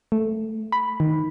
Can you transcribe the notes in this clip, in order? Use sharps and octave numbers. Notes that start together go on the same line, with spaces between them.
A3
B5
D#3